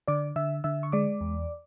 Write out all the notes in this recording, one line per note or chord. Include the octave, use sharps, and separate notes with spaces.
D3 D5 D6
D3 E5 E6
D3 E5 E6
C#6
G#3 D5 D6
E2